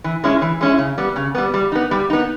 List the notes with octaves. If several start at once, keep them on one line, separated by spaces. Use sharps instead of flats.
E3
G#3 C#4 E4
E3
G#3 C#4 E4
C#3
G3 B3
C#3
G3 B3
G3
B3 D#4
G3
B3 D#4